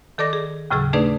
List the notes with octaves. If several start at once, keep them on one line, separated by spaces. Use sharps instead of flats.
D#3 A4 D5 D6 A#6
G#4
D#2 A2 C#3 F#3 G#4 E6
A3 D4 D#4 G#4 B4 D5